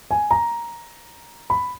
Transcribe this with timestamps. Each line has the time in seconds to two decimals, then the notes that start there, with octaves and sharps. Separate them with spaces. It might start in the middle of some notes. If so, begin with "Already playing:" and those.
0.11 G#5
0.31 A#5
1.50 B5